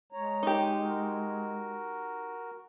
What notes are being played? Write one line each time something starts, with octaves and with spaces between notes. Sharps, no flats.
G#3 C#5 A#5
D#4 G4
F#4 A#4